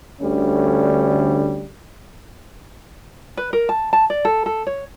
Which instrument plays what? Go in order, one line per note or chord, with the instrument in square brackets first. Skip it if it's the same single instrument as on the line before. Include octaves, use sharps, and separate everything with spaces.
[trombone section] D2 D3 G3 C#4
[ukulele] B4
A#4
A5
A5
D5
A4
A4
C#5